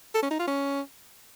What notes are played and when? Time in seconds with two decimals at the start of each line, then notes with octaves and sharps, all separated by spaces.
0.14 A4
0.22 C#4
0.31 D#4
0.39 F4
0.47 C#4